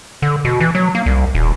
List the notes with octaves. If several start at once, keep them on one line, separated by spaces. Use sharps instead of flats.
D3
B2
E3
F#3
A#3
C2
D#1